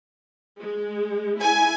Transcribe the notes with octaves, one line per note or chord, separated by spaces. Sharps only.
G#3
E4 G#5